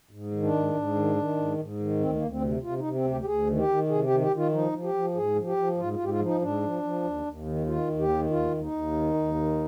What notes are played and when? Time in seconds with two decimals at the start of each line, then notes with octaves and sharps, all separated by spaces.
0.11 G#2
0.32 D#3
0.43 D4
0.53 G#2
0.74 G#2
0.95 D#3
1.16 D#3
1.37 G#2
1.58 G#2
1.79 D#3
2.00 D2 C4
2.16 A#3
2.21 D2
2.32 C4
2.42 C3
2.63 C3 F4
2.78 D#4
2.84 C3
2.94 C4
3.05 D2
3.10 G4
3.21 G4
3.26 D2 G#4
3.47 D#3
3.57 G4
3.68 D#3
3.89 C3 G#4
4.05 G4
4.10 D#3
4.21 G4
4.31 D#3
4.36 F4
4.52 F3 D#4
4.72 F3
4.84 G4
4.94 F3
5.15 G#2 G#4
5.36 F3
5.46 G4
5.57 F3
5.78 G#2 F4
5.93 F4
5.99 G#2
6.04 G4
6.09 F4
6.19 F3
6.26 D#4
6.41 G#2 D4
6.62 F3
6.83 F3
7.04 D#2
7.25 D#2
7.46 D#3
7.66 D#3 F4
7.88 D#2
7.99 G4
8.09 D#3
8.30 D#2 F4
8.51 D#2
8.61 D#4
8.72 D#2
8.92 D#3
9.14 D#2
9.34 D#3